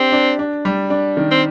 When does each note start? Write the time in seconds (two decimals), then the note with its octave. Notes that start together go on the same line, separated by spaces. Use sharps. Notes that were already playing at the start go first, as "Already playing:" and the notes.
Already playing: C4 D4 G4
0.12 D4
0.39 D4
0.65 G3
0.90 D4
1.17 D#3
1.31 C4